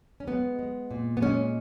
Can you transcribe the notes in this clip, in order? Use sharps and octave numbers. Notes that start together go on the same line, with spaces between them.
C#4
G#3 B3
G#3
A#2
B3
G#3 C#4